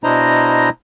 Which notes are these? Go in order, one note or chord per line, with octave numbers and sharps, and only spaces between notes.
B2 D4 E4 C5 D#5 A#5